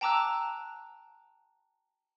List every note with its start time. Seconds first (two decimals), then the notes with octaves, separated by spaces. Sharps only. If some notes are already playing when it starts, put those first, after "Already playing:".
0.01 G5 A5 A#5 D6 E6 F#6